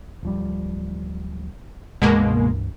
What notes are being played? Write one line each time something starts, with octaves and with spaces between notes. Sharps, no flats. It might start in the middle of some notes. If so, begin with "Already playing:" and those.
D1 F3 G3
C#2 G2 B2 E3 G#3 A#3